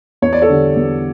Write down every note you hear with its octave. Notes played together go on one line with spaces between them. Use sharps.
E2 C#5
D5
A4 C#5
D3 G3
E2